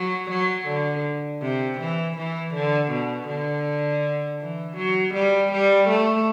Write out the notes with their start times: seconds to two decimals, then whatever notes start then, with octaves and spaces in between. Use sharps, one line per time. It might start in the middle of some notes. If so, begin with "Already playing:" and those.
Already playing: F#3
0.31 F#3
0.67 D3
1.42 C3
1.80 E3
2.17 E3
2.55 D3
2.91 B2
3.28 D3
4.41 E3
4.77 F#3
5.14 G3
5.52 G3
5.89 A3